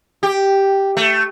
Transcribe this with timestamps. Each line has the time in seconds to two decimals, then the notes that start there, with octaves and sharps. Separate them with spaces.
0.23 G4
0.97 A3